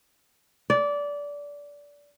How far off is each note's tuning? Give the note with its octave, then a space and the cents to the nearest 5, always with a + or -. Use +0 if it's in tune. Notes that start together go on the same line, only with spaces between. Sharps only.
D5 -20